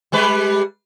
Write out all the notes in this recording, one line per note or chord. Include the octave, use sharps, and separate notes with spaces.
G3 G#3 B4